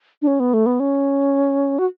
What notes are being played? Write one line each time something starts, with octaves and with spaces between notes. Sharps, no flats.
D4
C#4
B3
A3
B3
C#4
F#4